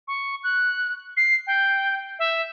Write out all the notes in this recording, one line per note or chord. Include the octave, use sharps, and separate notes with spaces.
C#6
F#6
C7
G5
E5